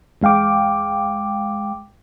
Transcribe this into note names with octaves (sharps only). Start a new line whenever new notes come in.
E2 G#3 F5 G5 D6